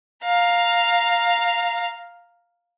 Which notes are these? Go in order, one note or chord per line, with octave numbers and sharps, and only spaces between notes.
F5 A#5